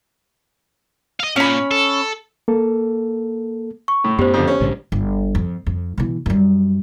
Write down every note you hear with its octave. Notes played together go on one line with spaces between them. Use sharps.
D#5 F5
A#2 C#4 B5
A4
A#3 A4
C#6
A2
F#2 B3 G4 C5
F2 D3
C#4
A#1 G#2 D3
G1
F2
F2
B2 E3
F#2 G3